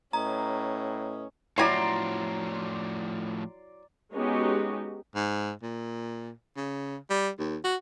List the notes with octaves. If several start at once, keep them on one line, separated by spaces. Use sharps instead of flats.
A2 C#4 B4 D#5 A#5 D#6
A2 F3 F#3 E4 D5 G#5 A#5 C6
G#3 B3 C#4 D#4 F#4 G4
G#2
A#2
C#3
G3
D#2
F#4